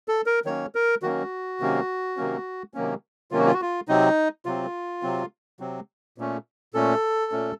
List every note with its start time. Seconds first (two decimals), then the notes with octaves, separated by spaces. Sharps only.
0.08 A4
0.26 A#4
0.45 D#3 F#3 A#3 C#4 C#5
0.75 A#4
1.03 D#3 F#3 A#3 C#4 F#4
1.60 C3 D#3 F#3 A#3 C#4
2.17 C3 D#3 F#3 A#3 C#4
2.74 C3 D#3 F#3 A#3 C#4
3.31 C3 D#3 F#3 A#3 C#4 F4
3.39 F#4
3.46 F4
3.54 F#4
3.62 F4
3.88 C3 F#3 C4 D#4
4.45 C3 F#3 C4 F4
5.02 C3 F#3 C4
5.60 C3 F#3 C4
6.18 A#2 A3 C#4
6.74 A#2 A3 C#4 A4
7.32 A#2 A3 C#4